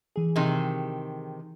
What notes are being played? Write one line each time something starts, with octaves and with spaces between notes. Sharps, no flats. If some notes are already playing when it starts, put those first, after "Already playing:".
E3 G#4
C3 D#3